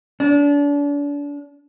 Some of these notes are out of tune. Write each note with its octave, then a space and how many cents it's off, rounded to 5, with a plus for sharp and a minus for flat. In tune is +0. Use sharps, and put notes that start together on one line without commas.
D4 -35